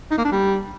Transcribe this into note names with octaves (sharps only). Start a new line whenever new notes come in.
D#4
A#3
D4
G3